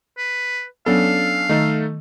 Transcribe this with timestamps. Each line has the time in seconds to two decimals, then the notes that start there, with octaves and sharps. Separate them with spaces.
0.18 B4
0.86 F#3 B3 C#4 D4 A4 F5
1.49 D#3 A3 D#4 A4